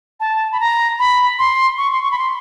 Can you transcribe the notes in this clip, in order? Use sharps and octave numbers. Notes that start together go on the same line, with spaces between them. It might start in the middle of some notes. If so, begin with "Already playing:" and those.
A5
B5
A#5
B5
C6
C#6
C6
C#6
B5
C6